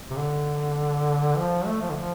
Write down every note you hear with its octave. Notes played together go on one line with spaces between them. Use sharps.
C3
D3
F3
A3
F3
D3
F3